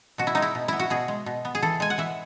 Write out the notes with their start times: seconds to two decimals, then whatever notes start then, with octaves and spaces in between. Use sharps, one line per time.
0.18 B2 F#4
0.27 E4
0.35 G#3 D#4
0.42 E4
0.55 B2
0.68 B3 E4
0.80 F#4
0.90 B2 G#4
1.08 G#3
1.26 B2
1.45 B3
1.55 G#4
1.62 E3 A4
1.80 G#3 G#5
1.90 F#5
1.98 E3 E5